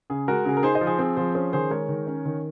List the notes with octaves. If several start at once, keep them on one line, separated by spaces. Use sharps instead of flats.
C#3 G#4
G#3 F#4 A#4
C#3 G#4
A#4
D#4 G#4 C5
C5 D#5
F3
G#4 C5
C4 G#4
F3 G#4 C5
C#4 G#4 C5
D#3 G#4 C5
G#3 A#4 C#5
D#3
C#4
D#3